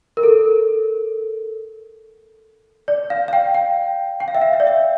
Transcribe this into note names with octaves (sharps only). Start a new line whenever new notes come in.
A#4
A4
D5
F5
F5
G5
G5
G5
F5
E5
F5
E5
D5
E5